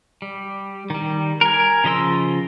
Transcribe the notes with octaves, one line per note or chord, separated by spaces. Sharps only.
G3
D#3 G3
A#4 G#5
C#3 F3 D#5 C6 E6